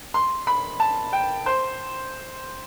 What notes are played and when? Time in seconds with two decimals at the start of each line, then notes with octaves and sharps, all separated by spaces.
0.14 C6
0.47 B5
0.80 A5
1.13 G5
1.46 C5